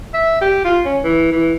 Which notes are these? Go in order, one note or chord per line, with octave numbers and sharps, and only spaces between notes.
E5
G4
F4
C#4
E3
E3